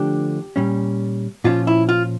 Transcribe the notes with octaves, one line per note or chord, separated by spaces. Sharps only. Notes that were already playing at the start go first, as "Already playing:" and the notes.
Already playing: D3 F3 A3 D4 G4
A#2 G3 C#4
A#2 F3 C#4 F4
E4
F4